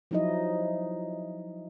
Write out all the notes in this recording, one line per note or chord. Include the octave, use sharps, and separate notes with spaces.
F3 F#3 D#4 E4 D#5